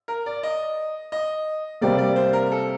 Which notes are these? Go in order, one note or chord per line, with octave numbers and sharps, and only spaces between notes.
A#4
D5
D#5
D#5
C3 G3 A#3 D5
D5
C5
A#4
A4